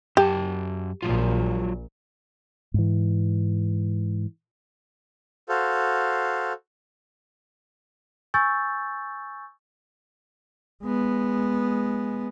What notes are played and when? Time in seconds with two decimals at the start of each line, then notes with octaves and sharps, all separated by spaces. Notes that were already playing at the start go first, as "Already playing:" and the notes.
0.17 F#2 G4 A5
1.02 A#1 A#2 F#3 F4
2.74 G#2 E3
5.49 F#4 A4 C5 F5
8.34 G#5 C#6 E6 G6 A6
10.83 G#3 B3